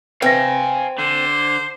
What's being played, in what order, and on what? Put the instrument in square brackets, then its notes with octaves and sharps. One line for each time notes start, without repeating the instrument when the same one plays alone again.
[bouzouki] C4 [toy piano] B4 E5 [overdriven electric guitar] F5 G#5
[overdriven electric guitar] D3 [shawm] C5